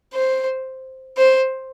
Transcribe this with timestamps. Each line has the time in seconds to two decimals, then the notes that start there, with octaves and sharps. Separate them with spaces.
0.14 C5
1.17 C5